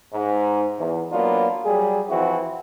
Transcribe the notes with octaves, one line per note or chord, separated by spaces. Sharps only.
G#2
E2
F#3 A#3 B3 D4 F4
F#3 G3 G#4
E3 F3 C4 E4 F#4